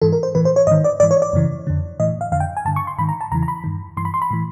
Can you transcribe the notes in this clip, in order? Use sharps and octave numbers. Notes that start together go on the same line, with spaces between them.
G#2 E3 A4
A#4
C5
A2 E3 B4
C5
C#5
G#2 D#3 D#5
D5
G#2 E3 D5
C#5
D5
F#2 C#3 E3
F2 D3
A2 E3 D#5
F5
F2 D3 F5
G5
G#5
G2 D3 A5
C#6
C6
G#2 D#3 B5
A#5
A5
E2 C#3 E3 A#5
A#5
B5
G2 D#3
G2 E3 C6
B5
C6
B5
A2 E3